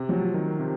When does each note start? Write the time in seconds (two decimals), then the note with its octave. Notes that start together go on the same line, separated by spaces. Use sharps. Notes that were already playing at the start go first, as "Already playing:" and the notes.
Already playing: C3
0.09 F3 F#3
0.34 D#3
0.59 C3